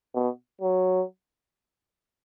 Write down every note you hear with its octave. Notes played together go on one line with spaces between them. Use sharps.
B2
F#3